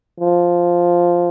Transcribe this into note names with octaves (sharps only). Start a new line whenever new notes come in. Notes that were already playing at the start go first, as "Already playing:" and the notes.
F3